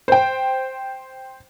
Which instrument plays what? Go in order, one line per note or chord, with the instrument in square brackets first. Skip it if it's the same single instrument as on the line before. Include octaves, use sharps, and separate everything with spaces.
[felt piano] C5 G5